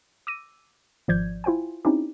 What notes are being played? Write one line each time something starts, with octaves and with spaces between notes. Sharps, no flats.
D6 E6 A#6 D#7
G#1 F3 D5 G6 G#6
E4 F4 C5 G5 G#5
C4 C#4 D#4 E4 G4